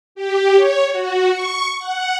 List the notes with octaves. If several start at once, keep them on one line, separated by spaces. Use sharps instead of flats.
G4
C#5
F#4
C#6
F#5